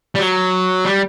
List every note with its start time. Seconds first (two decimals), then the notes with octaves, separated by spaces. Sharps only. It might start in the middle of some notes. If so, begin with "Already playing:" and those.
0.15 G3
0.19 F#3
0.85 G3